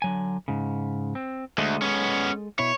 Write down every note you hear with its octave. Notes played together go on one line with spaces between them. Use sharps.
D3 F#3 G#5
G#2 C#3
C4
D2 G#3 A4 D#5
B3 C#4
B2 E4 C#5